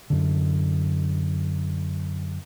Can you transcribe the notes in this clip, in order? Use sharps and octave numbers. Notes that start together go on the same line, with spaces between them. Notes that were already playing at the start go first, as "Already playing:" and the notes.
F#2 D3